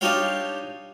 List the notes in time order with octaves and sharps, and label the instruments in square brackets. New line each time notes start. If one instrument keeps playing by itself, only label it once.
[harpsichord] D4 D#4 F4 G4 C#5 F5